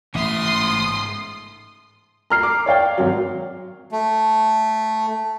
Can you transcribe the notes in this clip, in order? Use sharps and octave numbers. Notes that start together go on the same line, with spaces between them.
A1 G#2 E5 C6 D#6
A#5 F6 C7
D6
C#5 D5 F5 G5
G#1 F#3
A3